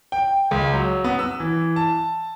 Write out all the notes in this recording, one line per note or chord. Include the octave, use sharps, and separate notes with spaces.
G5
C#2
F#3
B3
E6
E3
A5